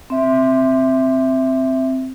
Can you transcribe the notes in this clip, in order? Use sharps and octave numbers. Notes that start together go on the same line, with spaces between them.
C4 E5